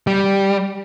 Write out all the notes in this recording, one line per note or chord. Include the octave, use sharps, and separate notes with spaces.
G3